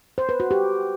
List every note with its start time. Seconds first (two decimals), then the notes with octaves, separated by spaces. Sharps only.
0.18 C5
0.29 B4
0.40 F#4
0.51 G4